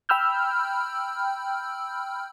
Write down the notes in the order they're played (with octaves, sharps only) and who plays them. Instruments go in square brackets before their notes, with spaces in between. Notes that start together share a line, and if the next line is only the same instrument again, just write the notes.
[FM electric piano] G5 B5 E6 F6 G6